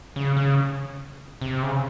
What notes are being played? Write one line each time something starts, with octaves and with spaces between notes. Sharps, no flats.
C#3
C#3
C3
C#3